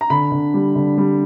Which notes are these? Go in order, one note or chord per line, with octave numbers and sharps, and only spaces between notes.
A#5
D3 B5
D3
G3
D3
G3